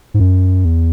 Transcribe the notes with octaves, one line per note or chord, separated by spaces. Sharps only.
G#2
F#2
E2